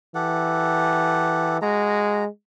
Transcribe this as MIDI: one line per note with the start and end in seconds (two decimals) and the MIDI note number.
0.15 1.60 52
0.15 1.58 67
0.15 1.58 69
0.15 1.58 78
1.62 2.27 56
1.62 2.24 66
1.62 2.24 82